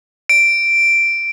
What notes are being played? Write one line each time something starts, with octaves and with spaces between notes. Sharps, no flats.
D7